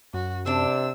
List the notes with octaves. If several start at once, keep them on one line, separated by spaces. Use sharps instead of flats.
F#2 F#4
C3 C4 D4 E6